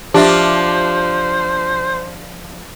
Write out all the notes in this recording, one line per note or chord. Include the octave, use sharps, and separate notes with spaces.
F3 D4 F4 G4 C5 E5